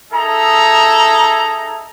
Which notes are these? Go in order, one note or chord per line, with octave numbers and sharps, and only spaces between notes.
D#4 G#4 A4 E5 A#5